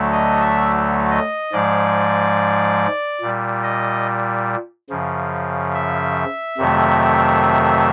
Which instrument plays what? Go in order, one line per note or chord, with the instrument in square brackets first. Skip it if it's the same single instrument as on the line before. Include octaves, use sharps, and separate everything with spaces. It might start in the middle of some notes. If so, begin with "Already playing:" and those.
Already playing: [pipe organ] D2 D3 F#3 A3
D#5
E5
D#5
G#2 F3 G#3 D5
A#2 G3
D#5
F#2 C#3 F3
E5
F2 C3 D#3 F#3 A3